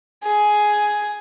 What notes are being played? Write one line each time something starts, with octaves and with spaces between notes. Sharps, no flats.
G#4